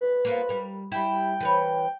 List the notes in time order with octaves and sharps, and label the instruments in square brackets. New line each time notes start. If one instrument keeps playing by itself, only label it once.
[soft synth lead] B4
[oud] A#3 B3 F4
G3 A#4
[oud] G3 E4 [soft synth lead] G5
[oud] E3 B4 C#5